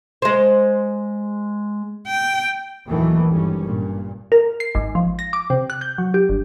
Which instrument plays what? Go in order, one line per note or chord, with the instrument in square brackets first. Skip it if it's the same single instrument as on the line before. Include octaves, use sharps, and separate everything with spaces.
[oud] G#3 C5
[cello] G5
[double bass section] D#2 A#2 D#3 E3 F#3 A3
G#1 G2 G3 C#4
G2 A#2
[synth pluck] A#4
C7
G#1
F3
A#6
D6
C3
F#6
G6
F#3
G4
G1